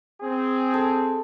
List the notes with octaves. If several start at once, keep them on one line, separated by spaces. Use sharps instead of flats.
C4 G#4
A4